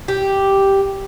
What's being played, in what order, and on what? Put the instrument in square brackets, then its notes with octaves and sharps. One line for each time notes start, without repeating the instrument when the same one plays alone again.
[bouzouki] G4